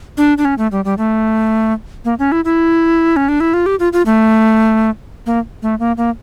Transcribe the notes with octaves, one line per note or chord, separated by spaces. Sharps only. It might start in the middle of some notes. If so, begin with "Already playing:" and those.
D4
D4
C#4
A3
G3
G3
A3
A#3
C#4
E4
E4
C#4
D4
E4
F4
G4
F4
F4
A3
A#3
A3
A#3
A#3